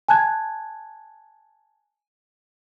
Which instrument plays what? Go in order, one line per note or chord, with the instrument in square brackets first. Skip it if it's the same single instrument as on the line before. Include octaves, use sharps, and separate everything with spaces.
[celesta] G#5 A5 F#6 G#6